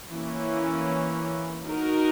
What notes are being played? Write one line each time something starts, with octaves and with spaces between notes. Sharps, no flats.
E3 A#3 C#4
D#4 F#4 A#4